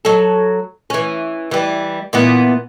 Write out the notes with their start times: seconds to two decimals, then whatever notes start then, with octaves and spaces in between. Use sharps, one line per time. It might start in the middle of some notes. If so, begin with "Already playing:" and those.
0.05 F#3 A4
0.90 E3 C#4
1.51 E3 G3
2.13 A#2 E3 B3